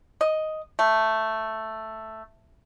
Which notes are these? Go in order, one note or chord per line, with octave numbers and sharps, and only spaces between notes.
D#5
A3